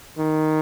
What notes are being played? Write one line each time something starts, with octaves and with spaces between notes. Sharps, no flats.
D#3